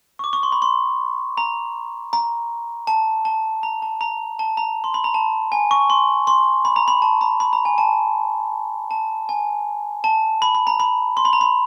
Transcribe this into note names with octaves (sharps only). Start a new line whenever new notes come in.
C#6
D6
C#6
C6
B5
C6
A#5
A#5
A5
A5
A#5
A5
A#5
A5
A#5
C6
B5
A#5
A5
G#5
C#6
C6
C6
B5
A#5
B5
A5
A#5
B5
A#5
G#5
A5
A5
G#5
A5
B5
B5
A#5
B5
C6
B5
A#5
B5